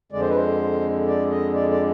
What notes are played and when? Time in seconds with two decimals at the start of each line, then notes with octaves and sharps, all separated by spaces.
0.12 F2 D3 G#3 D5
0.21 C5
0.29 B4
0.36 C5
1.07 D5
1.31 D#5
1.55 D5
1.71 D5